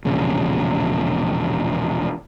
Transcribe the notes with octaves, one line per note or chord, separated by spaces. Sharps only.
E1 A#1 C#3